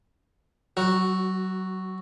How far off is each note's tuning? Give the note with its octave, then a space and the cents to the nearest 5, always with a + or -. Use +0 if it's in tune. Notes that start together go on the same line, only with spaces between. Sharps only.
F#3 +25 F#4 +0